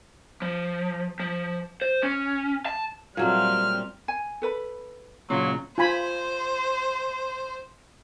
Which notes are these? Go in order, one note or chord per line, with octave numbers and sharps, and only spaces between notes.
F3
F3
C5
C#4
A5
A#2 F#3 G3 A3 C4 F6
G#5
A4 B4 B5
A#2 C#3 F#3 F4
F4 C5 G#5 B5